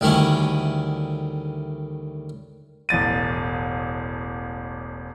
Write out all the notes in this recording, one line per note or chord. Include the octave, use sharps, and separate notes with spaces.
D2 D#3 G3 C#4 E4
E1 A1 A6 D#7